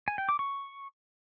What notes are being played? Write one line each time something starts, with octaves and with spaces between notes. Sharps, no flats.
G#5
G5
D6
C#6